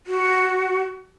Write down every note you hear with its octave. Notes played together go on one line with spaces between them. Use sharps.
F#4